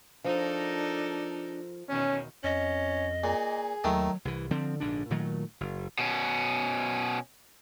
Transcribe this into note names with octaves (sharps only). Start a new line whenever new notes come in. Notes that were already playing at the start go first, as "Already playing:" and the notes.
F3 D4 D#4 A4 A#4
E2 B2 D#3 C#4
F2 C#4 D#5
A#2 G#4
D#2 D#3 F#3 A3
C2 E3
D3 F3 C4
A#1 G#2 D3 D4
A#2 D#3 F#3 A3
F#1
B2 C#4